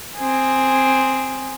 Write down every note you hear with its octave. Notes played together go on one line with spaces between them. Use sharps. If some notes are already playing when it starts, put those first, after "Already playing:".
C4 G#4